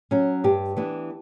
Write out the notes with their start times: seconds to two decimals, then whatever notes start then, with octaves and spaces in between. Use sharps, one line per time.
0.11 F#3 C#4
0.44 G2 G4
0.77 E3 B3 D4